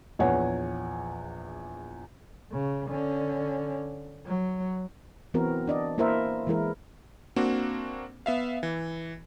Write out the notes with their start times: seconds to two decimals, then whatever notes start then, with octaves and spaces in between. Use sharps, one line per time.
0.19 A#1 E2 C#5 F#5 G#5
2.52 C#3
2.89 D3 C#4
4.27 F#3
5.34 E3 B3 C4 F#4 A#4
5.68 D4 D5 D#5
5.98 A#3 E4 A#4 C5 E5
6.47 E3 G#3 E4 A#4
7.36 A#3 C4 D4 F#4
8.26 B3 E5 F5
8.63 E3